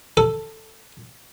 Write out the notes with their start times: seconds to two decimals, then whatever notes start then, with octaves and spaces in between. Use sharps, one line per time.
0.17 A4